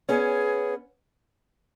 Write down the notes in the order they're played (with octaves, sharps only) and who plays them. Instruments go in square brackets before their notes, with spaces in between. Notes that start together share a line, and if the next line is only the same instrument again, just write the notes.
[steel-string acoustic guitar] B3 C#4 [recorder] G#4